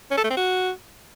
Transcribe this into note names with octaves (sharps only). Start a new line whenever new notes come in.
C#4
A4
A3
C4
F#4